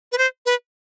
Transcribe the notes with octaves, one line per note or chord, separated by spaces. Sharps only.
B4
C5
B4